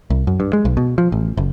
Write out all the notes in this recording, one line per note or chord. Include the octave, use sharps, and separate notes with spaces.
C2
F#2
G2
G#3
B1
B2
F3
A1
F#1